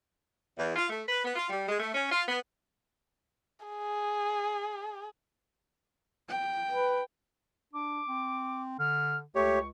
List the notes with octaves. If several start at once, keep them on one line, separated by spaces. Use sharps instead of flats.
E2
F4
A3
B4
B3
F4
G3
G#3
A3
C#4
F4
B3
G#4
G5
B4
D4 D6
C4
D3 F6
C#2 A3 G4 C#5 C#6